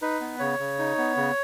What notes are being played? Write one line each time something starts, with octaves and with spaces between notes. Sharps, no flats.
D#4 B4
B3
C#3 C#5
C#3
D#4
B3
C#3